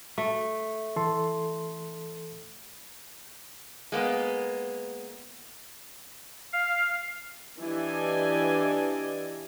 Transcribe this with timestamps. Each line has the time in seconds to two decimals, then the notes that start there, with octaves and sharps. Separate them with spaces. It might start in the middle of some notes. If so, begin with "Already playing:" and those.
0.18 A3
0.96 E3 A4 C6
3.92 G#3 A#3 B3
6.53 F5
7.60 E3 D4 G4 D5 D#5 G#5